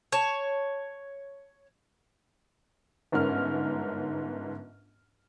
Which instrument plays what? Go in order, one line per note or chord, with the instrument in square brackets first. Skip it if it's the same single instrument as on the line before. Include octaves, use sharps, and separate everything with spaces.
[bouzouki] C#5 A5
[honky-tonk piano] G1 G#2 C#4 A#4 F6